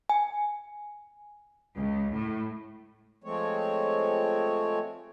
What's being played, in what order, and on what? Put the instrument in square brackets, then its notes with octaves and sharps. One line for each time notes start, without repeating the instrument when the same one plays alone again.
[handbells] G#5
[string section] C#2
A2
[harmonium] F3 G#3 A3 C4 C#5